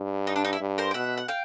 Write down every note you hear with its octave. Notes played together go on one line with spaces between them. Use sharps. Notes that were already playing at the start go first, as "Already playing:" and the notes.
Already playing: G2
D#4
D4
D#4
E4
G2
A#4 C5
G5
B2 E5 F#5
F#5
F5 G5